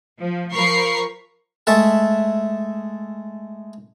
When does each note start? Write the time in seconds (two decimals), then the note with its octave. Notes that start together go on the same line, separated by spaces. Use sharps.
0.19 F3
0.53 F3 A#4 B5 C#6 C7
1.67 G#3 A3 E5 A5